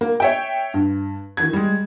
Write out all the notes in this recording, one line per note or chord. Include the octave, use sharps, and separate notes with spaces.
A#3
C#5 E5 G5
G2
D#3 E3 G#6
G3 G#3